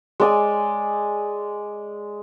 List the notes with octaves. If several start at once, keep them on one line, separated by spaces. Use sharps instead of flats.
G#3 D5 G#5